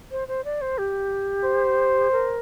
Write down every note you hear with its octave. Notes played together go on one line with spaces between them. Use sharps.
C5
C5
D5
C5
G4
C5
A#4